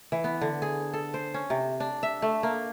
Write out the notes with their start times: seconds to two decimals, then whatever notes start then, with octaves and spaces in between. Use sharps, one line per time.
0.12 E3
0.24 B3
0.41 D3
0.62 G#4
0.93 A4
1.14 C5
1.34 C#4
1.50 C3
1.80 D4
2.03 E5
2.22 A3
2.43 A#3